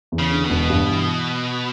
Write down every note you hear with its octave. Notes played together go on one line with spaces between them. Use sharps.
E2
C#3
D3
B2
E1
G2
E3